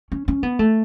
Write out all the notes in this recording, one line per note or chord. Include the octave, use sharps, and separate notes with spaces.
C#4
C#4
B3
A3